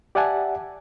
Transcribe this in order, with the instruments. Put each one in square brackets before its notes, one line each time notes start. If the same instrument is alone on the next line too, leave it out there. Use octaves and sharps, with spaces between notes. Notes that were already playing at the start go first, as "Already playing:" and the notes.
[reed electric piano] G4 D5 E5 F#5 G#5 A5